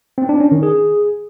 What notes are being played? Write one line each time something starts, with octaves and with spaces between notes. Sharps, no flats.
C4
D4
C#4
D#3
G#4